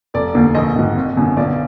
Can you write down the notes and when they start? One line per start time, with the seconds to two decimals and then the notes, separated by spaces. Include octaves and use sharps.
0.14 F1 D5
0.35 D#2 D3
0.55 A#1 D#5
0.76 G#2 D#3
0.97 G#1
1.17 F#2 D3
1.37 B1 D5